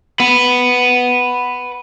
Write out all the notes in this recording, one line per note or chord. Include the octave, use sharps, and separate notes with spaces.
B4 F#5